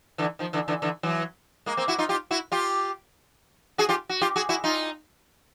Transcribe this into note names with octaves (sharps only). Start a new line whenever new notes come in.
D3 E3
D#3 F3
D3 E3
D3 E3
D3 E3
E3 F#3
G#3 A#3
A#3 C4
E4 F#4
D#4 F4
F4 G4
E4 F#4
F4 G4
F#4 G#4
F4 G4
F#4
F4 G4
F#4 G#4
E4 F#4
D#4 F4